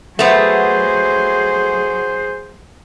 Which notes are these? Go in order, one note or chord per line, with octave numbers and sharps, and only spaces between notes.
F#3 A3 B3 G#4 C5